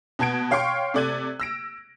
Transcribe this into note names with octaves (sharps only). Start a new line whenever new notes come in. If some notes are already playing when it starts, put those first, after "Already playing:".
B2 B3 A5 G#6 D7
C#5 F5 G5 C6 C#6
C3 A3 D5 F#6 G#6 D#7
E6 A#6 D7